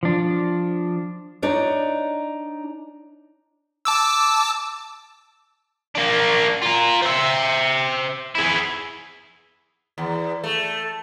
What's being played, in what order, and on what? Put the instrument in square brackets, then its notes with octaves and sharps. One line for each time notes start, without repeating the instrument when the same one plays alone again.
[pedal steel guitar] F3 D4
[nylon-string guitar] D4 D#4 C#5 D5
[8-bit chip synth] A5 D6 E6
[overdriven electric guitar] A#3 D4
F4 A#4
C5 E5
E4 G#4
[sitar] E2
A3